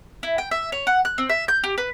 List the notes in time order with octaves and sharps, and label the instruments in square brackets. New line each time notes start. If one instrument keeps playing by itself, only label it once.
[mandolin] E4
G5
E5
C#5
F#5
F#6
C4
E5
G6
G4
B4